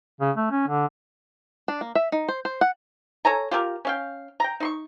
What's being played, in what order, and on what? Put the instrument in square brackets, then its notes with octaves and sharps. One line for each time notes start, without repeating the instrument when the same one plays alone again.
[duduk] C#3
A3
C#4
D3
[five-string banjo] D4
A#3
E5
D#4
C5
C5
F#5
[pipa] A4 C#5 G#5 A#5
F4 G4 G#4 A#4
C#4 F5 G5
G5 A#5
D#4 C6 C#6